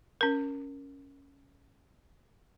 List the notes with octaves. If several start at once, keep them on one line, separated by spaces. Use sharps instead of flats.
C#4 A#4